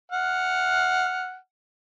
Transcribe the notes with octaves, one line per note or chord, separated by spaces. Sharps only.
F#5 F6